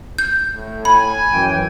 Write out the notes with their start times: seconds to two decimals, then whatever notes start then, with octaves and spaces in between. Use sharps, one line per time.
0.18 G6
0.53 A2
0.85 G#5 B5
1.32 F#2 E3 G5